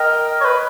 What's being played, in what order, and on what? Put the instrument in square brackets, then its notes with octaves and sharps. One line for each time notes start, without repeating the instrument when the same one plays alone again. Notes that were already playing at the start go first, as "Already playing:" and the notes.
Already playing: [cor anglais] A#4 [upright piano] D#5 G5
[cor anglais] C#5
B4